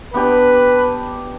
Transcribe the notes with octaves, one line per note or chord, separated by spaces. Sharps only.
B3 D4 G4 B4